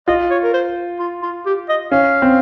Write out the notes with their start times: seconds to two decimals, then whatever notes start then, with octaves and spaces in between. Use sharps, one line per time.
0.08 F4 D#5
0.30 C#5
0.43 A#4
0.54 C5
0.99 F4
1.23 F4
1.46 G4
1.69 D#5
1.92 C#4 F5
2.22 C4